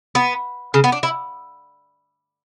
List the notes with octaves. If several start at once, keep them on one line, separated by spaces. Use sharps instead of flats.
B3
C#3
B3
D4
E4